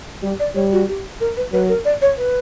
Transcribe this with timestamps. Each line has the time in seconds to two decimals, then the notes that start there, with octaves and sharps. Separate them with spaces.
0.23 G3 G4
0.40 D5
0.55 G3 C#5
0.72 F#4
0.88 G4
1.20 A#4
1.37 B4
1.52 F#3 B4
1.69 A#4
1.85 D5
2.02 C#5
2.18 B4